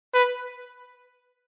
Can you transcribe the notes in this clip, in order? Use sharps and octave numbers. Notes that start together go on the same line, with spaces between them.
B4